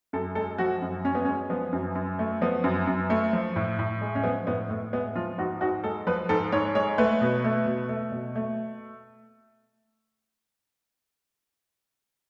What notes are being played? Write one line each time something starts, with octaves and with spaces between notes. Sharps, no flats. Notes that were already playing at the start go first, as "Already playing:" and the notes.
F#2 A4
G#3 A4
F3 F#4
F#2
F#2 C#4
B3
G#3 C#4
F3 B3
F#2
F#2
A3
F3 B3
F#2
F#2
A3
F3
A2
A2
G#3
C#4
F3 B3
A2 B3
A2 A3
G#3 B3
F3 F4
G#2 F#4
G#2 F#4
G#3 A4
F3 B4
G#2 A4
G#2 C#5
G#3 C#5
A3 B4
B2
A3
B2
A3
B2
A3